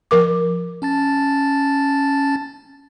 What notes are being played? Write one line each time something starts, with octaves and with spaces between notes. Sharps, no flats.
F3 A#4 D6
C#4 A5 A6